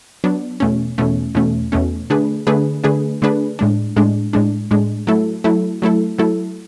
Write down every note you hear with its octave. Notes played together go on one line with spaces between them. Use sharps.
F#3 B3 D4
E2 B2 A3 C#4
E2 B2 A3 C#4
E2 B2 A3 C#4
E2 B2 A3 C#4
D3 A3 D4 G#4 B4
D3 A3 D4 G#4 B4
D3 A3 D4 G#4 B4
D3 A3 D4 G#4 B4
A2 G#3 D4
A2 G#3 D4
A2 G#3 D4
A2 G#3 D4
F#3 A3 E4 A4
F#3 A3 E4 A4
F#3 A3 E4 A4
F#3 A3 E4 A4